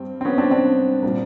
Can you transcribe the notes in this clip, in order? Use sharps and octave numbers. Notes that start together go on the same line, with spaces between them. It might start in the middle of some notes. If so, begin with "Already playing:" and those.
Already playing: G2 G3 C4
C4
B3 C#4
C4 D4
C4 D4
A#2 G3 A#3